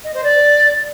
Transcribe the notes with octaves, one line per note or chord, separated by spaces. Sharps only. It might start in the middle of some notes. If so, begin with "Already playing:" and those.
D#5
C5
D5